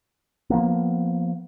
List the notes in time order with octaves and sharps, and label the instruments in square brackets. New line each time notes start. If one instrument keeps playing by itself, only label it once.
[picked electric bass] F3 A#3 B3